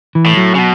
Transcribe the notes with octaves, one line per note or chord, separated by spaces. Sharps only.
E3
A2
F#3
C#3
B2